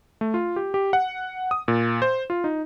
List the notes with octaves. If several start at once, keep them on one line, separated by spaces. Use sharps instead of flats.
A3
F4
G4
G4
F#5
D#6
A#2
C5
F4
D#4